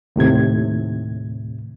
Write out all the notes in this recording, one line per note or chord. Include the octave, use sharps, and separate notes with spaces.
D#2 A2 C3 G#6